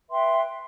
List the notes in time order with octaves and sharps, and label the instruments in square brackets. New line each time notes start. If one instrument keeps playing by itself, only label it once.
[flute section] B4 E5 G5 C6